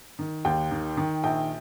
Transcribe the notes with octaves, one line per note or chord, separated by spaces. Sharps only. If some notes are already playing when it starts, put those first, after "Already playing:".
D#3
D#2 G5
D#3
D#3
A#1 G5